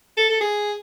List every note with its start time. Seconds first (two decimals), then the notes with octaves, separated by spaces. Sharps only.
0.17 A4
0.30 A4
0.41 G#4